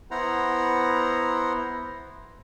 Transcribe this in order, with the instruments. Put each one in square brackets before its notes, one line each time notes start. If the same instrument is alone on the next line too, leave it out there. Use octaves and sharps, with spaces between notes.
[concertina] B3 E4 C5 F#5 A#5